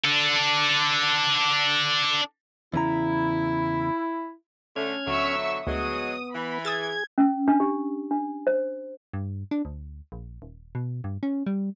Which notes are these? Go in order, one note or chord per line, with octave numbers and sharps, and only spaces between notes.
D4 A4
E2 C#3 E4 A#5
D3 A3 C#4 F6 G#6
D2 B2 D3 F#3 E5 C#6 E6
D2 F#3 G#3 B3 D#6
E3 B5
G#4 D#6 E6 G#6 A6
C#4
D4
G4
D4
C5
G2
D4
D2
A#1
D#1
B2
G2
C#4
G3